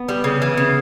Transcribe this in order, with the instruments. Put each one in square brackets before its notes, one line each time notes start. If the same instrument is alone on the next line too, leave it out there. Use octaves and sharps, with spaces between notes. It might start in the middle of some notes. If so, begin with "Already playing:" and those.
Already playing: [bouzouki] B3
G3
C#3
E3
C#3